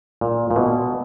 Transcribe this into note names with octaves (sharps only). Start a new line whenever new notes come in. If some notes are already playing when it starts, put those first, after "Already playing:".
A#2
A#2
B2